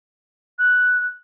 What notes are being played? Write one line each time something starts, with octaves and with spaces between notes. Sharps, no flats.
F#6